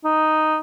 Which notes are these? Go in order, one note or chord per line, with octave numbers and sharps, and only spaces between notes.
D#4